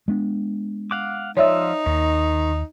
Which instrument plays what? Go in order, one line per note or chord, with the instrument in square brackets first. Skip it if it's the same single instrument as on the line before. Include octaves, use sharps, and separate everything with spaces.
[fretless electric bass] G#3 B3 D4
[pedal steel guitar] F5 F#5 D6
[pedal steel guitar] F3 F4 E6 [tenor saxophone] D#4 [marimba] C#5 D5 E5
[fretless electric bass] D#2 [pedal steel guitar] D#3